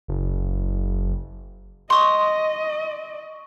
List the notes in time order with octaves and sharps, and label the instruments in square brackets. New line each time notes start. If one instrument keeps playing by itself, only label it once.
[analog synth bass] F#1
[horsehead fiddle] D#5 [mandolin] C6 D#6 [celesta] C#6